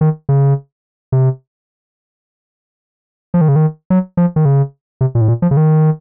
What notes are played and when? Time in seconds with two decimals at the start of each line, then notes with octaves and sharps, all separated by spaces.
0.01 D#3
0.29 C#3
1.12 C3
3.34 F3
3.41 D#3
3.49 C#3
3.56 D#3
3.90 F#3
4.17 F3
4.36 D#3
4.45 C#3
5.01 C3
5.15 A#2
5.21 A2
5.28 A#2
5.42 F3
5.51 C#3
5.57 D#3